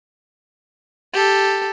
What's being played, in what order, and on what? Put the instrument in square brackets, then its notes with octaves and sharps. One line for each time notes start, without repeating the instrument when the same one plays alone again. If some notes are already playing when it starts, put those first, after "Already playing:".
[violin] G4 A4